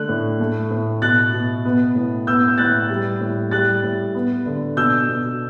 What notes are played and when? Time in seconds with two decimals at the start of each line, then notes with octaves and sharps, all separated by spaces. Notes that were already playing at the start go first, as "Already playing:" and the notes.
Already playing: D3 A3 F#6
0.09 A2
0.40 A3
0.71 A2
1.02 B2 F#6 A6
1.33 B2
1.65 B3
1.95 A2
2.27 B3 E6 G6
2.48 G6
2.58 A2 F#6 A6
2.90 G3
3.21 A2
3.51 G3 F#6 A6
3.83 A2
4.15 B3
4.46 D3
4.76 B2 E6 G6
5.09 B2